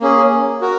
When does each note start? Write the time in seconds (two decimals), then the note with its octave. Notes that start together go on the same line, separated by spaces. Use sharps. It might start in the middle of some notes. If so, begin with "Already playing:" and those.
0.01 A#3 C#4 G#4
0.61 F#4 A#4